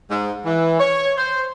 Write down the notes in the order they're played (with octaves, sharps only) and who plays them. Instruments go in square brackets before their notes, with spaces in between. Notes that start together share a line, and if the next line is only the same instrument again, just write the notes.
[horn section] G#2
E3
C#5
C5